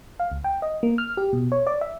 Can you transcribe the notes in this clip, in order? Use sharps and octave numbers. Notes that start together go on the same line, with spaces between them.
F5
C#2
G5
D#5
A#3
F6
G4
B2
C#5
D5
E5